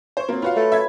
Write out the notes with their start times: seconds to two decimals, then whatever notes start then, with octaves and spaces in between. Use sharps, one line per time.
0.17 C5 C#5 C#6
0.29 F#3 A#3 C4 F4
0.42 F4 F#4 B4 F5
0.56 A3
0.72 E5 G#6